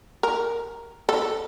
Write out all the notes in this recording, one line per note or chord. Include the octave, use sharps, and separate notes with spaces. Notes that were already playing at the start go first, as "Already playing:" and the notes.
A#4
A4